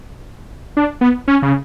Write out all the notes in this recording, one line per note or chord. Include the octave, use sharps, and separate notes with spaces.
D4
B3
C#4
C#3